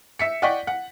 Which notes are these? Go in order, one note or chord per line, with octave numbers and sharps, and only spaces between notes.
E5 B6 C#7
D5 D#5 F#5 G5 C#6 B6
F#5